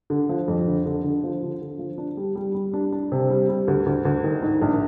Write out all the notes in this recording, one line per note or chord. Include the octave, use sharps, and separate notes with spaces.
D3
F3
F2
D3
D3
D3
F3
D3
D3
F3
D4
G3
G3
G3
D4
D4
C3
G3
G3
D2
D2
D2
D#3
G#2
A#1